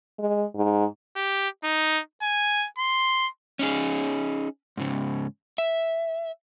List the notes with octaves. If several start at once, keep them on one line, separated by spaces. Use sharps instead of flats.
G#3
G#2
G4
D#4
G#5
C6
C#4 D#4 G#4
G#2 C#3
E5